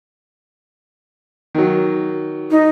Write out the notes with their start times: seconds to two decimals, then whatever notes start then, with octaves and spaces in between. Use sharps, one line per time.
1.55 D#3 F#3
2.51 D#4